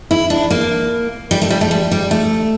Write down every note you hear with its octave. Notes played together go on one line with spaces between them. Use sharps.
E4
D4
A#3
G3
A3
G3
A3
G3
G3
A3